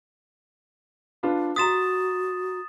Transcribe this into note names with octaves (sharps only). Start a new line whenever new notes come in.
D4 F4 B4
F#4 A#5 C6 D#6 A6 B6 E7